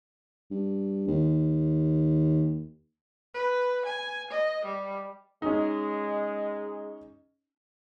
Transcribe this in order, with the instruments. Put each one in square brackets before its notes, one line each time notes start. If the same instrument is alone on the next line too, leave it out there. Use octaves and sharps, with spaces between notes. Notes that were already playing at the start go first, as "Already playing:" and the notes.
[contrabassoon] G2
D#2
[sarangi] B4
G#5
D#5
G3
[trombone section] G#3 [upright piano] C#4 D#4